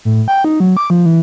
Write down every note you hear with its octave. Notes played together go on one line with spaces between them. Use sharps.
A2
G5
D#4
F#3
D6
F3
E3